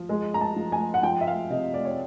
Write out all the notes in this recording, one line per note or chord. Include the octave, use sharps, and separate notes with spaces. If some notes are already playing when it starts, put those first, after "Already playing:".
Already playing: F3
G#3
A#5
A5
F3
G#5
F#5
F3 G5
E5
F5
C3 D#5
D5
C#5